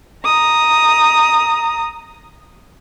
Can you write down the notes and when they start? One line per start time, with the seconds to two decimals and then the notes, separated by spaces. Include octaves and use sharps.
0.25 A#5 D#6